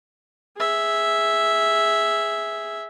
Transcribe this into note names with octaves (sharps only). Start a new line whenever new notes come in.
G#4 E5